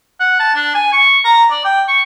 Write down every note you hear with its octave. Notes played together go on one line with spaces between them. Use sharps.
F#5
A5
D4
G#5
C#6
A#5
D5
G5
C#6